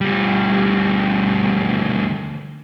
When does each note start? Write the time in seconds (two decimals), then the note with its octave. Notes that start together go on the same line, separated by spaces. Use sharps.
0.01 D2 G3